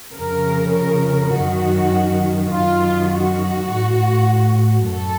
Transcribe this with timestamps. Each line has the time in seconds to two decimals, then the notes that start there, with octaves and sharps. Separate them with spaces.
0.13 F2 C#3 A#4
0.73 A#4
1.31 F#2 D#3 F#4
2.49 F#2 D#3 F4
3.09 F#4
3.68 A2
4.86 F#2 A4